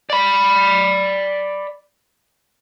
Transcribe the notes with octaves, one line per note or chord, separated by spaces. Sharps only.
D5 B5